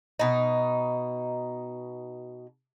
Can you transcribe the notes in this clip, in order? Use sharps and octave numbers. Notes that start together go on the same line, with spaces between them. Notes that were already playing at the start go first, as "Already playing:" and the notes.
B2 D#4